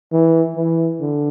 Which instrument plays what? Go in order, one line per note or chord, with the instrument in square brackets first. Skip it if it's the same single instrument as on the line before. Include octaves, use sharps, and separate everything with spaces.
[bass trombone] E3
E3
D3